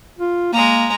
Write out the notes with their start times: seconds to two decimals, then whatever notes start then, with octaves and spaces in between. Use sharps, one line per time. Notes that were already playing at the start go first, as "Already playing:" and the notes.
0.19 F4
0.53 G#3 A#3 A#5